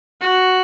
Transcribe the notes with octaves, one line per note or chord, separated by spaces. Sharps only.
F#4